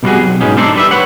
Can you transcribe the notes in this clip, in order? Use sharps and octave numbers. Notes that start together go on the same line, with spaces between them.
B2 G3 F4 F#4 G#4
B1
G#2 B2 G#3 C#4 D#4
D4 D#4 A4 C5 D5
G3 B4 E5
B4 C#5 F#5